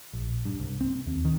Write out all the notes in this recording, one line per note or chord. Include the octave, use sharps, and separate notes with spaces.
A#1
G2
C2
C4
D#2
D#3